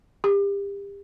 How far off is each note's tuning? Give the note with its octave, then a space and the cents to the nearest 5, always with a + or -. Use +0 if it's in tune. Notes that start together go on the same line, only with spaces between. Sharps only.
G4 +30